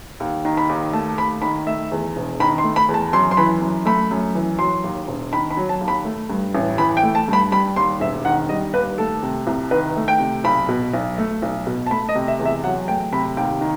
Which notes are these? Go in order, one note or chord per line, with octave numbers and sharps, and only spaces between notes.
D#2
D#3
B5
D#2
A3 A5
D#2 B5
D#3 B5
A3 E5
E2
E1
D#3 B5
C6
A3
B5
E2
A5
F#2 C6
C6
E3 B5
F#2
A3 B5
F#2
E3
F#3 C6
D#2
E1
D#3 B5
B5
F#3
A5
D#2
B5
A3
G2
A1
E3 B5
G5
A3
A5
G2 B5
G3 B5
D#2 C6
E1 E5
D#3 F#5
G3 D#5
D#2 B4
A3 A4
C3
C2
D#3 B4
A3
G5
C3
B1 B5
B2
B1
A3
B1
B2
A5
A3 B5
D#5
C3
E5
E2
E5
F#3 F#5
A3 G5
C3 B5
D#2 G5
D#3